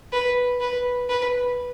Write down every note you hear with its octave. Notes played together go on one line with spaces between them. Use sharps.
B4
B4
B4